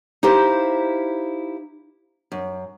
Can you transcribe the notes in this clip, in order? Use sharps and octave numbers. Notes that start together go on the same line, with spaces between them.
D#4 E4 G4 C5 F5
F#2